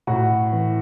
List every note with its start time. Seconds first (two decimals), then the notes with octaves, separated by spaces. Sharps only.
0.07 A2 F#4
0.52 E3